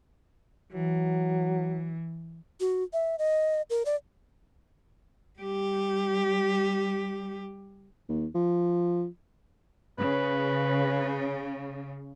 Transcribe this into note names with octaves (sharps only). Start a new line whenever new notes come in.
E3 F#3
F#4
E5
D#5
A#4
D5
G3 G4
D#2
F3
C#3 B4